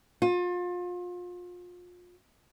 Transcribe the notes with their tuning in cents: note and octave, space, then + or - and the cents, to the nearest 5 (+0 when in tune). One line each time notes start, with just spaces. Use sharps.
F4 +30